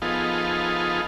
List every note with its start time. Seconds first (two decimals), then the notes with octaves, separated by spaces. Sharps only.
0.02 F3 B3 D#4 F4 G#4 A4